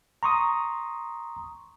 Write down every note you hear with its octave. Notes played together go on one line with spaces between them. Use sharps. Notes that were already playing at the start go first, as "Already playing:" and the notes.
A#5 C6 C#6 D#6